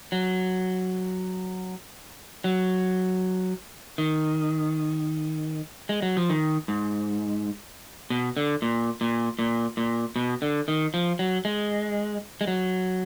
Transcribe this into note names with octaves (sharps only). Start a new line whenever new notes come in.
F#3
F#3
D#3
G#3
F#3
F3
D#3
G#2
B2
D3
A#2
A#2
A#2
A#2
B2
D3
D#3
F3
F#3
G#3
G#3
F#3